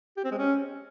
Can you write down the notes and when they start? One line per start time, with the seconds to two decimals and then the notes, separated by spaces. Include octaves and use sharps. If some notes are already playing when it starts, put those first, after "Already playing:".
0.17 G4
0.24 C4
0.31 G#3
0.39 C#4